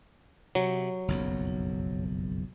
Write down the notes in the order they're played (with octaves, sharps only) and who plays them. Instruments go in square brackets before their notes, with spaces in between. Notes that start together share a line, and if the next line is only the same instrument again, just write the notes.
[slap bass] C3 [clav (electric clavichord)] F#3
[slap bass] F#1 B1 F2